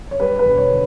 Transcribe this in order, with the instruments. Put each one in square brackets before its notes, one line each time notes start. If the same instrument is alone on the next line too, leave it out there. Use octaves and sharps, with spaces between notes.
[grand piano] C#5
G3 B4
B4
E1
C#5
D3